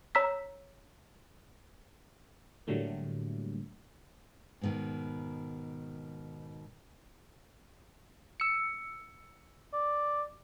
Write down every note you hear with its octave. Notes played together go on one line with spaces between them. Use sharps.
C#5 A#5 E6 B6
A2 D3 F#3 G3 A3 A#3
G#2 B2 D#3
E6 C#7
D5